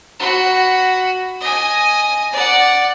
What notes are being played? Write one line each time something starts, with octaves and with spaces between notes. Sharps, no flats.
F#4 B5
D#5 G#5
D5 F#5